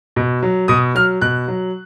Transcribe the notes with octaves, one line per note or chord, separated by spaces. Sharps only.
B2
F#3
B2 D#6
F#3 F6
B2 F#6
F#3